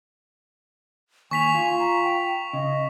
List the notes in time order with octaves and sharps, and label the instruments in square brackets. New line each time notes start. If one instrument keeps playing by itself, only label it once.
[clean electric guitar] D#2 [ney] G#5 [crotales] C#6 B6 F7
[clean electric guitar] F4
[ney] A#5
G5
[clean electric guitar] C#3 [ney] D#5